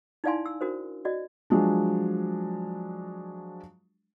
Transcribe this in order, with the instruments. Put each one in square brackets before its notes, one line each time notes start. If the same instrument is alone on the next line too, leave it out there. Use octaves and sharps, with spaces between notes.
[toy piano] D#4 E4 D5 F5 G#5 C6
E6
D4 F#4 A#4 C5
F#4 D5 D#5
[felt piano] F3 F#3 G#3 D4